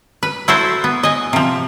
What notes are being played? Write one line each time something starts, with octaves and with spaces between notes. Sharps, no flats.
B4
E4 F#4 A4 C5
B3
D#5 G#5
C3 F3